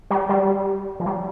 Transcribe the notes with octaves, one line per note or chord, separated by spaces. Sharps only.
G3
G3
F3
G3